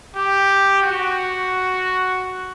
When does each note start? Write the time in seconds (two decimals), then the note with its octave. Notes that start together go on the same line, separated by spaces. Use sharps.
0.15 G4
0.82 F#4